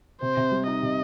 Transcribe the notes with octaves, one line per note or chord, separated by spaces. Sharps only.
C3 C5
C3
G3
D#4 D#5
C3